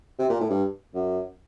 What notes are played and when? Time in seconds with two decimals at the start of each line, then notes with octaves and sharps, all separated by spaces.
0.19 C3
0.30 A#2
0.40 A2
0.50 G2
0.94 F#2